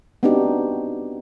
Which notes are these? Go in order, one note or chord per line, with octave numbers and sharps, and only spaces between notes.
B3 C4 D4 D#4 F#4 G4